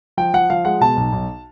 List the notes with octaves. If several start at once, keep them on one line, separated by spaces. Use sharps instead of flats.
F3 G5
F3 F#5
F3 F5
G#3 F#5
B2 A5
B1
B1